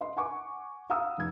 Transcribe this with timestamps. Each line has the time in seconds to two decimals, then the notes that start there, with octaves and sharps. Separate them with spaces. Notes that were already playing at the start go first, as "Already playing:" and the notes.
0.01 D#5 C6
0.17 F#5 G#5 C#6 D6
0.90 F5 F#5 A#5 D#6 E6
1.17 F1 D#4 G#6